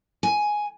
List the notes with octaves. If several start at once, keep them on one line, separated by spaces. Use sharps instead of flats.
G#5